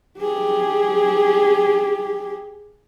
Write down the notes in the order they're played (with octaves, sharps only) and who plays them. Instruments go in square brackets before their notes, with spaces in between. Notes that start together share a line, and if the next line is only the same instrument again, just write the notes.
[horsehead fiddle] G4 G#4